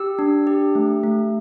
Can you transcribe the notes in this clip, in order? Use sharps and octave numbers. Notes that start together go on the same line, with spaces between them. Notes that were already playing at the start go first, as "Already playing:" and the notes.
Already playing: G4 E6
D4
G4
A3
A3